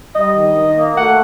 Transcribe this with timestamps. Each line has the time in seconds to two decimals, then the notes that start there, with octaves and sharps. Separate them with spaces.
0.15 G3 D#5
0.36 D#3
0.56 D#3
0.76 A#3
0.97 A3 F#5